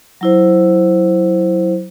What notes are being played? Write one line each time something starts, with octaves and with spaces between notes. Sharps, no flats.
F#3 E4 C5